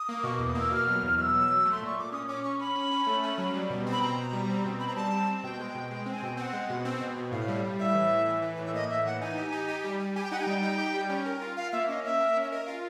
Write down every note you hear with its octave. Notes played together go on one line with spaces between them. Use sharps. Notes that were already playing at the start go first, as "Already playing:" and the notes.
Already playing: D#6
A#3
B2 C#6
E2 D6
D#6
A#3 E6
B2 F6
F#3
E2 F6
B2 E6 F6
F#3
F#3
A3
C6
A#2 C#6
A#2 D6
C#4 D#6
C#4 D6
C#4 C#6
C#4 B5
C#4
C#4
A3
C#4
F#3
G3
B2
C4
B5
B2 A#5
B2
G3
C4
B2
C4 B5
A#5
G3 A5
C4
C4
B2 G5
G#3
B2
G#3
C4
G#5
B2 G5
C4 F#5 G5
G#3
B2
C4
B2
B2
A2 F5
G3
G3
A2 E5
E3
A2
E3
E3
A2
E5
A#3 D#5
A2 E5
E3 F#5
D#4 G#5
G4
D#4
G4
G3
G3
G4 G#5
G5
D#4 F#5
G#5
G3 G5
D#4
G4
G3
C#4
A#4
F4
F4 F5
A#3 E5
C#4 D#5
A#3 E5
A#4
C#4
E5
A#4 D#5
F4 F5